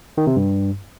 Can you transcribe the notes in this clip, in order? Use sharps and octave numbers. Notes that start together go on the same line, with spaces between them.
D#3
C3
G2